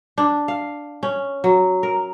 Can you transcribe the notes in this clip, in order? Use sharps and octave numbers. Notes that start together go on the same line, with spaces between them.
D4
F5
C#4
F#3
A#4